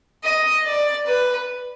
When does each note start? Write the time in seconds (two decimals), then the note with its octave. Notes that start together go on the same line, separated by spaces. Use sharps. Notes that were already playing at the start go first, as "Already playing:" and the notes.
0.24 D#5
0.66 D5
1.07 B4